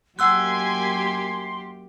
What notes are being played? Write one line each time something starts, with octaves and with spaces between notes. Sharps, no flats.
F#2 A#3 G4 F#5 G#5 C6 E6 F#6